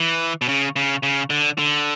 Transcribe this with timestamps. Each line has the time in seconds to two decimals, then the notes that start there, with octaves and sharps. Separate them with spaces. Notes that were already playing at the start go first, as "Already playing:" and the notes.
Already playing: E3
0.42 B2
0.48 C#3
0.76 C#3
1.03 C#3
1.30 D3
1.58 D3